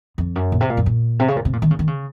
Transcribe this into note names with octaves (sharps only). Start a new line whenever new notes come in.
F2
F#2
A#2
C3
A#2
F#2
A#2
C3
C#3
A#2
C3
A#2
D#3
C#3
D#3
C#3